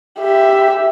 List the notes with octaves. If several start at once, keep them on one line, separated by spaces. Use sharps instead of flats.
G4 E5